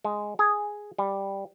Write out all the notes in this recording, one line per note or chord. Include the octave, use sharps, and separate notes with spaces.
G#3
G#4
G3